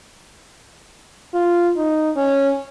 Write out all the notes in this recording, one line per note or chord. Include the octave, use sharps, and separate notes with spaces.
F4
D#4
C#4